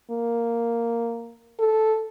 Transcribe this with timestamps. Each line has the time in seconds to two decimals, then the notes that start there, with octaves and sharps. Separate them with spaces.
0.11 A#3
1.60 A4